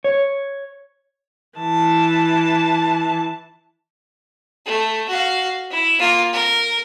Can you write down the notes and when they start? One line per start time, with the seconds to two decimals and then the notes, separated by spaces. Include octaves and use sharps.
0.04 C#5
1.59 E3 A5
4.66 A3
5.09 F#4 F5
5.71 E4
5.99 A#3 F4
6.33 A#4